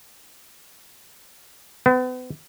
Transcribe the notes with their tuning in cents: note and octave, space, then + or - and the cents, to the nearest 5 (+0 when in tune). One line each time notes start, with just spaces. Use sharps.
B3 +40